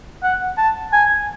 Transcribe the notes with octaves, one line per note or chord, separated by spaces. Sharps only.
F#5
A5
G#5